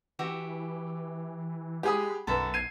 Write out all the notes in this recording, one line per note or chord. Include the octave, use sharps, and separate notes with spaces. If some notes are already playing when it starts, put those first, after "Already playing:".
E3 F#4 G4 E5
G#3 G4 G#4 F#5 B5 D#6
B1 F#2 A4 B4 E5
G#6 C7 D#7